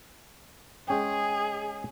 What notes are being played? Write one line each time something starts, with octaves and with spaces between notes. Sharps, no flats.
G#3 C#4 G#4 G5